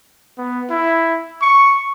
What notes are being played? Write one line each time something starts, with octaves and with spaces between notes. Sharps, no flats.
B3
E4
C#6